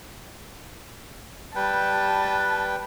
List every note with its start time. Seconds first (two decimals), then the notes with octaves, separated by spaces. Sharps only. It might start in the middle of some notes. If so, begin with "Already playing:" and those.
1.55 G3 B4 G5 A5